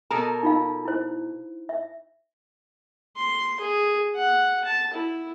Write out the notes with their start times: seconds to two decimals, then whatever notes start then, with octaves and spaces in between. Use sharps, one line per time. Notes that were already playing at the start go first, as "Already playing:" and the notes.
0.11 B2 A4 A#4 A#5
0.43 D#4 F4 F5
0.85 E4 C5
1.69 E5
3.17 C6
3.60 G#4
4.16 F#5
4.65 A5
4.94 E4